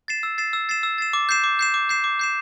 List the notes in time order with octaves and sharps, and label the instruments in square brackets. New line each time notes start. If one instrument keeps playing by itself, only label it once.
[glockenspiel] A6 C7 E7
E6
A6 C7 E7
E6
A6 C7 E7
E6
A6 C7 E7
D6
G6 C7 E7
D6
G6 C7 E7
D6
G6 C7 E7
D6
G6 C7 E7